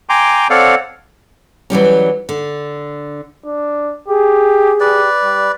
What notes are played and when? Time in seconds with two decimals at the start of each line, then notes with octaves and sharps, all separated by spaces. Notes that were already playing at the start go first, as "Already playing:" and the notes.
0.09 G5 G#5 A#5 C6 D6
0.50 C4 A4 C#5 D5 F5 F#5
1.70 E3 F#3 G3 C#4
2.29 D3
3.45 D4
4.08 G4 G#4
4.80 G4 B4 D5
5.23 G3